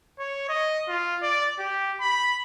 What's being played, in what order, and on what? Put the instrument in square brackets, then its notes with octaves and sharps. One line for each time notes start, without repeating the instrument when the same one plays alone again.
[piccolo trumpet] C#5
D#5
F4
D5
G4
B5